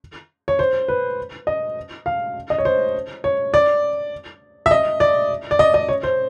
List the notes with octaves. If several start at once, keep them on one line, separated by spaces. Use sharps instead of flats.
C#5
C5
B4
D#5
F5
D#5
C#5
C5
C#5
D5
E5
D#5
D5
D5
D#5
D#5
C#5
C5